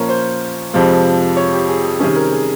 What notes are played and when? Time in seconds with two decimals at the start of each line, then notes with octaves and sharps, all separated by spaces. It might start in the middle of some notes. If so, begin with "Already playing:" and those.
Already playing: A#2 F3 A#3 C#4 A#4 C#5
0.09 C5
0.73 F2 C3 F3 G#3
1.37 C#5
1.52 G4
1.69 G#4
1.84 G#4
2.00 C3 D#3 G3 C#4 G#4
2.16 A#4
2.32 G#4